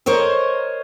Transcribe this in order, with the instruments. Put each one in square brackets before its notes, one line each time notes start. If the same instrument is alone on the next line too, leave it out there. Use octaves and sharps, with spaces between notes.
[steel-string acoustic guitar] A#4 C5 C#5 D#5